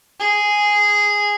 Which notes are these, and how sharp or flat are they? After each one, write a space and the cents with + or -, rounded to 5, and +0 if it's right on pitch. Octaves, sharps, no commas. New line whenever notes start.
G#4 -5